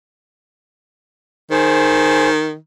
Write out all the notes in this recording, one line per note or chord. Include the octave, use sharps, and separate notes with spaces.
D#3 G#4 C5